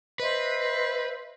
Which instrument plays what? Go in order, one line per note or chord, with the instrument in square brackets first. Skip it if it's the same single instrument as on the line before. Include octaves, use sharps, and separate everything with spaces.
[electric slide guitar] B4 [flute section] C5 D#5 E5